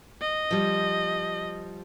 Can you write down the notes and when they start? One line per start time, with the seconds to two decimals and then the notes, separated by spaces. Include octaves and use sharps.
0.21 D#5
0.51 F3 G3